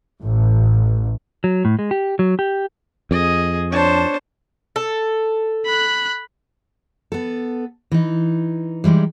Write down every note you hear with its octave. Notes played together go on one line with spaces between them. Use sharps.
A1
F#3
A2
G#3
G4
F#3
G4
F2 G#4 D#5
D4 C5 C#5 A5
A4
B5 F#6
B3 A4
E3 D#4
E3 G3 G#3 D#4